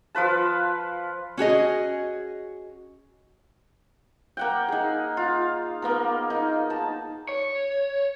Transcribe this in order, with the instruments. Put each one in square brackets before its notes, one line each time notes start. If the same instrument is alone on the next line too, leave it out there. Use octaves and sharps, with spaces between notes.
[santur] F3 F4 B4 A5
[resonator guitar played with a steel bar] C#4 F#4 G#4 D#5
[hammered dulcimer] A#3 F#5 G5
D#4 G#4
F4
A#3 B3 A#4
D#4
A5
[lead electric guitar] C#5